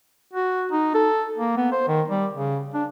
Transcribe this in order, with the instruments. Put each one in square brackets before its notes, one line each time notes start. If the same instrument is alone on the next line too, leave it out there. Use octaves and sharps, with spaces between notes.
[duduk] F#4
D#4
A4
A#3
B3
C5
D#3
G3
C#3
D4